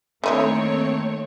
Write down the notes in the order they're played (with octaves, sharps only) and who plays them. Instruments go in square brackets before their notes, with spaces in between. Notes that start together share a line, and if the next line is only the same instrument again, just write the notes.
[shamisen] D3 D#4 E4 [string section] D#3 C4 C#5 [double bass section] A3 A#3